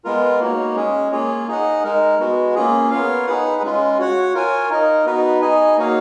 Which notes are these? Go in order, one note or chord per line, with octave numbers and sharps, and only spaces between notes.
G#3 B3 F4 A#4
A#3 D#4 F#4 A#4 C#5
G#3 C#4 G#4
A#3 F4 G#4 C#5
D#4 G#4 D#5 F#5
G#3 D#4 A#4
G#3 B3 F#4
A#3 C#4 F4 G#4
B3 F4 A#4 C#5 F5
D#4 G#4 B4 F#5
G#3 C#4 F4
F#4 C#5 F#5
F4 A#4 C#5 G#5
D#4 A#4 D#5
B3 D#4 F#4 B4
D#4 G#4 D#5 G#5
A#3 D#4 F#4 C#5 F5